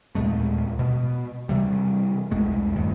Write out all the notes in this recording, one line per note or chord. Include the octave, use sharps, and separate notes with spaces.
D#2 A#2 G#3 A3
B2
C3 E3 G3
B1 E2 G#3 A3
D#1 G2 D#3 A3